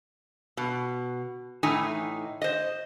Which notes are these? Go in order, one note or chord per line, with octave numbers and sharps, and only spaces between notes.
B2
A2 E3 D#4 G#5
C5 D#5